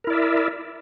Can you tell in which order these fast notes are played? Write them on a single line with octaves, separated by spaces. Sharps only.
A#4 E4 D5 E5